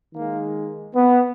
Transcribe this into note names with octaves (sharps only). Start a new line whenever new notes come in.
D#3 G#3 A#3
B3